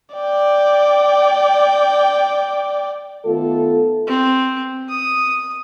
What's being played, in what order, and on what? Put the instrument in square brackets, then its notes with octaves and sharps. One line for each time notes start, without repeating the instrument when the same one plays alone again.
[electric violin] D5 G5
[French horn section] D#3 A3 B3 F4 A4
[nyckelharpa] C4
D#6